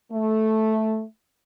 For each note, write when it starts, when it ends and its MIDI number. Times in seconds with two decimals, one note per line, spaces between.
0.12 1.03 57